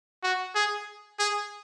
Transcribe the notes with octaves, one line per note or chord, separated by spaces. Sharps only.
F#4
G#4
G#4